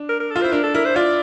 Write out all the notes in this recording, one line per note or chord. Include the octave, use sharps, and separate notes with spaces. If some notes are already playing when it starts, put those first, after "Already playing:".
Already playing: D4
A#4
A#4
A4
F4
E4 C5
D4 A#4
A4
E4 A#4
C5
F4 D5